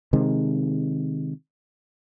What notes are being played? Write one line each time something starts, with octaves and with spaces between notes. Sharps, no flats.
C3 D#3 G#3